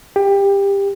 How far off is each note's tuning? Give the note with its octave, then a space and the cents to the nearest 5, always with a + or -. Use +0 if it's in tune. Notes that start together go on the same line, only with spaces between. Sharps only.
G4 +20